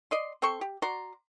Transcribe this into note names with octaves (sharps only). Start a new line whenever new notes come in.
D5 D#5 C6
C4 A4 C6 C#6
G4
F#4 D5 A#5 C6